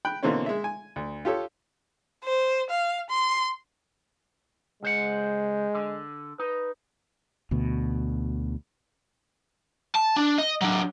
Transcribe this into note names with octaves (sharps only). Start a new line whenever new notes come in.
G5 B5 F#6
B2 D3 E3 A#3 C4 C#4
G#3 E5
G#5
D2
F4 G4 A4 C#5
C5
F5
C6
C#2 G#3 C5 F#5
D3
D#4 B4
D2 B2
A5
D4
D#5
F#3 D4